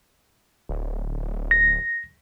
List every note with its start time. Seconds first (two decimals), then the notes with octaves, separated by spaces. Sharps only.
0.69 D1
1.51 A#6